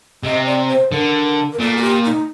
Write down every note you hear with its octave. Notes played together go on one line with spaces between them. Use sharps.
C3 D#5
D5
C5
D3 A#4
A#4
A#2 A4
F#4
G4
D#4